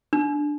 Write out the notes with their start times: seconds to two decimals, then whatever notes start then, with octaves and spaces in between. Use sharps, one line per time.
0.13 D4